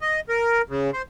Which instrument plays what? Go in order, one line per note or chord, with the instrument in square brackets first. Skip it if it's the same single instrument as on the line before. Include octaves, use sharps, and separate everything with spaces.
[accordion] D#5
A#4
C#3
C5